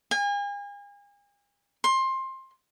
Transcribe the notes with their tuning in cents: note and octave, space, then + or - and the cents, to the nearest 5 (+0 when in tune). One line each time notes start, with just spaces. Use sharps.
G#5 -40
C6 +20